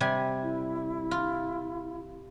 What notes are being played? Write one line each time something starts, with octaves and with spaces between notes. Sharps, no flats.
C3 G3 G#5
E4
F4